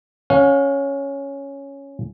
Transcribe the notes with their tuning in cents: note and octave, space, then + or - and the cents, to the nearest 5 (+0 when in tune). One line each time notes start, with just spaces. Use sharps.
C#4 +0 F5 +45